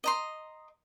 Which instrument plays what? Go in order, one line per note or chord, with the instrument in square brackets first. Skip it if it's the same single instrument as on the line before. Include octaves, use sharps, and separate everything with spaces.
[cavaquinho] D#5 A#5 C6